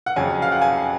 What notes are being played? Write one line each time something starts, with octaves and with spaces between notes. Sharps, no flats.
F#5
F2 C#3 F#3 G#5
F5
F#5
G#5